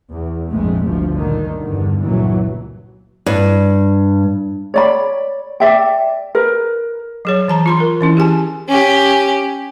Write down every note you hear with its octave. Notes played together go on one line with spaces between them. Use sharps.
E2
A#1 F2 G#2 G#3 A3
G1 D2 F3
A#2 D3 D#3
E2 G2 D3
G1 C#2 A#2 E3 F#3
G2
C#5 D5 B5
D5 E5 G5
A#4 B4
F#3 G#4 C#5
E3 A5 A#5
F4 B5 C6
A#4
E3 C#4 E4
G4 G#4 G#5 A5
C#4 G4